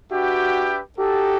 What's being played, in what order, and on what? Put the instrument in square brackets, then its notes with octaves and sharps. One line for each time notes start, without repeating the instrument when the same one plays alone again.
[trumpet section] D4 G4 B4 E5 G5 [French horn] F#4
[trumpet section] D#4 F#4 A4 [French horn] G4